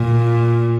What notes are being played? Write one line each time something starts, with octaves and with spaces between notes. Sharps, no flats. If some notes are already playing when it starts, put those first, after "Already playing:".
Already playing: A#2